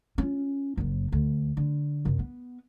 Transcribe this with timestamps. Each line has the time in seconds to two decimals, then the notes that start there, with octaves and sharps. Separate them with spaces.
0.18 C#4 F4
0.77 F#1 F#2
1.12 D2
1.57 D3
2.05 F#2 C3
2.19 B3